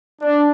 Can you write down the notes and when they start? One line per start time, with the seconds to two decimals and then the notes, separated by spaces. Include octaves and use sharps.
0.22 D4